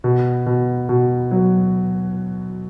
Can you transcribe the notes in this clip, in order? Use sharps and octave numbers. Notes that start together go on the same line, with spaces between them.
B2
B2
B2
F#3